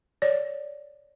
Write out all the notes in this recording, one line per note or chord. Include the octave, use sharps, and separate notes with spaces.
C#5 D5